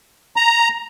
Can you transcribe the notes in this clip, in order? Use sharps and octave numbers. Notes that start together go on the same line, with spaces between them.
A#5